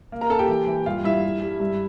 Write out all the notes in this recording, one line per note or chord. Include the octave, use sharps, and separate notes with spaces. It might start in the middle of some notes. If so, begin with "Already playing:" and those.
A#3
A#4 A#5
A#2 A4 A5
G4 G5
E3
E3
G2 F4 F5
G2 E4 E5
G3
G3
G2